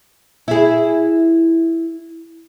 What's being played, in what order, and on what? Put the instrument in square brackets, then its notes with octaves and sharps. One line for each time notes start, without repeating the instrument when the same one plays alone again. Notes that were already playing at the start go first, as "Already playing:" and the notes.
[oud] E4 G#4